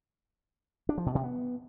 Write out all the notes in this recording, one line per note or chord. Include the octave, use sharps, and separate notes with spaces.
D4
F3
B2
C3
B3